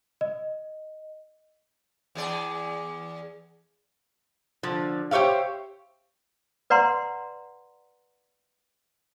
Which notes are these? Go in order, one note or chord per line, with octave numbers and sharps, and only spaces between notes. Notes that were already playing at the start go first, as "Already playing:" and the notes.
D#5
E2 G#4 D5
D3 F3
G4 C5 C#5 E5 F5
B4 D5 F#5 A#5 C6